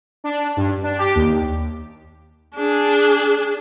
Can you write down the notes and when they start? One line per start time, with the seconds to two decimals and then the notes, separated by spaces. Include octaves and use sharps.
0.24 D4
0.57 G2
0.83 D4
0.98 G4
1.15 D#2
2.55 D4 G#4